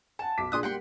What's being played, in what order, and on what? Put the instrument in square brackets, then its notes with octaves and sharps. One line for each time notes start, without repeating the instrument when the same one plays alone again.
[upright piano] F#5 G#5 [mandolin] A5
[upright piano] B1 D6 B6
[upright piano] A#2 D4 G#4 [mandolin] C6 D#6 F#6
[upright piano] G3 A#3 [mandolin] F#5 G5 C6